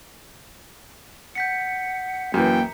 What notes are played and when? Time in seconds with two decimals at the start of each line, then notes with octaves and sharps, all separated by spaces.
1.35 F#5 G6 B6 C#7
2.34 F#2 E3 A#3 G5 A#5